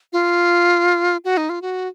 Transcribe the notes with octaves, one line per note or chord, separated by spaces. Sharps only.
F4
F#4
D#4
F4
F#4